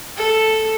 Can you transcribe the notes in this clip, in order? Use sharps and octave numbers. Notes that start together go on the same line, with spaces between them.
A4